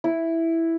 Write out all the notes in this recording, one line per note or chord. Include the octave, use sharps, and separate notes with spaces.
E4